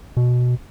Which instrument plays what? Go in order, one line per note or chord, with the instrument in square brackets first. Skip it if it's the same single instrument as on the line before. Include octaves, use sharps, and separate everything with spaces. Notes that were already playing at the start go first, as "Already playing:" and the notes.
[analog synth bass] B2